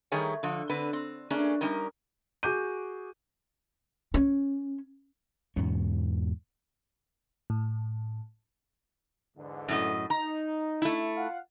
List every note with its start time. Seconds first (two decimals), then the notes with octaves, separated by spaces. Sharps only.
0.12 D#3 G3 A3 G#4 A#4 C#5
0.43 D3 F3
0.70 D3 C4 B4
0.93 C4
1.30 A3 A#3 C#4 D4 G#4
1.61 G3 C#4 D#4 A#4
2.43 F#4 G#4 D6 G6 D#7
4.14 C#4
5.56 E2 G#2 B2 C#4
7.50 A2
9.37 E2 G#2 D3
9.68 F#2 A2 D#5
10.10 D#4 A#5
10.82 A3 E4
11.17 F4 F5 F#5